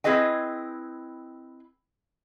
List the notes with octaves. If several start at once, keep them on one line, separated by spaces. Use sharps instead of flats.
C4 E4 G#4 B4 D#5 G5